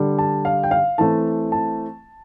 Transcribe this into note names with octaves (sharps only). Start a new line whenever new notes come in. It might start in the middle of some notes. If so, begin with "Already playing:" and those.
Already playing: D3 G3 D4
A5
F5
G5
F5
E3 A3 C4 A5
A5